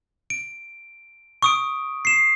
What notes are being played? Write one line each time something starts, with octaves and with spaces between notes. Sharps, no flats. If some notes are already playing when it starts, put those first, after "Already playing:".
D7
C#6 D#6 D7
C7 E7